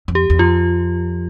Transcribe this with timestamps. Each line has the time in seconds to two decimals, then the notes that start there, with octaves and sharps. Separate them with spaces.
0.08 F2
0.15 G4
0.30 E2
0.39 F2 F4